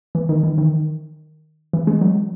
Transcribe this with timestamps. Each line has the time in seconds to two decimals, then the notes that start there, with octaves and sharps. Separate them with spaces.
0.15 E3
0.29 D#3
0.43 E3
0.58 D#3
1.73 E3
1.87 G#3
2.01 F#3